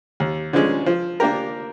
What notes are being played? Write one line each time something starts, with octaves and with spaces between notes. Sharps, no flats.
D#2
D3 F3 G#3 C#4
F3
A#3 D4 G4 A#4